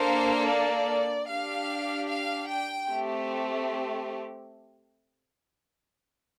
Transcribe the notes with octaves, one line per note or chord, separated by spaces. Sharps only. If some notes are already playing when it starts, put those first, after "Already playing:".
Already playing: A#3 D4 A4 C5
D5
D4 G4 F5
F5
G5
A3 C4 G4